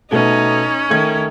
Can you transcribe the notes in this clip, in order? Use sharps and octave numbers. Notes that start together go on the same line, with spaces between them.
B2 A3 B3 C#4 D#4
D#3 A3 G#6